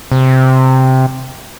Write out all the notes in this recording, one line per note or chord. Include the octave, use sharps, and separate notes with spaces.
C3